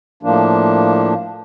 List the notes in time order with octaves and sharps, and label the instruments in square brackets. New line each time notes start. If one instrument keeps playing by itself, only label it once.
[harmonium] A2 F3 A#3 D4